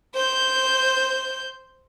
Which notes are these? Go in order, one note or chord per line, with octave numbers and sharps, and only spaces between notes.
C5 G6